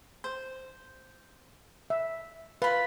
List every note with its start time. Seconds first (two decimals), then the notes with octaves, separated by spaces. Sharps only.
0.24 C5
1.90 E5
2.62 F4 B4 B5